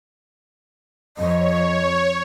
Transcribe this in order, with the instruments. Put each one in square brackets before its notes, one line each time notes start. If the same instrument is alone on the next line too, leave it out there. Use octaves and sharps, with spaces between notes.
[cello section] F2 [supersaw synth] C#5 [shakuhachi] D#5